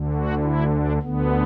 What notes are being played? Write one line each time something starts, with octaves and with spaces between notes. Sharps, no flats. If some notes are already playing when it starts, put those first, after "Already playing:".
Already playing: D2 D3
F#4
E4
D4
D2 D3 B3